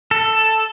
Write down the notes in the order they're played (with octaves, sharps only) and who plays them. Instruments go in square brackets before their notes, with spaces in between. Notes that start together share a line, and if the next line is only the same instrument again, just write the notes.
[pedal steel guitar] A4